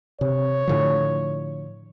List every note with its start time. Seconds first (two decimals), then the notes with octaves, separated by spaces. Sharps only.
0.21 C3 C#5
0.68 A2 D3 F3